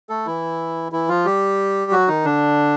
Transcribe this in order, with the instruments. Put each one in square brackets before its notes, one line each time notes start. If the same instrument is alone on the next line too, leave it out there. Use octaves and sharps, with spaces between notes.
[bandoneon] A3 A4
E3 E4
E3 E4
F3 F4
G3 G4
F#3 F#4
D#3 D#4
D3 D4